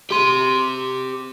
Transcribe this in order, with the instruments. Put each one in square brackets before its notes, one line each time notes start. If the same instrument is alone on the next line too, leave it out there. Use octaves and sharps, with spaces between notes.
[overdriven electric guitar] G4 C6